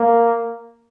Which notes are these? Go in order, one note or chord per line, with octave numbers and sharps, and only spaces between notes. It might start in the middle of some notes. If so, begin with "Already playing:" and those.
Already playing: A#3